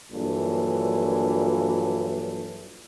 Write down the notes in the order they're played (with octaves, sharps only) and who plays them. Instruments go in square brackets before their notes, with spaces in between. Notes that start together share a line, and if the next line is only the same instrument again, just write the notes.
[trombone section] A#1 G2 A#2 E3 F#3 A4